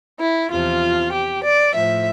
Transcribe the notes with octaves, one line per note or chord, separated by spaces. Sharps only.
E4
E2 C3 F3 F4
G4
D5
A2 F3 E5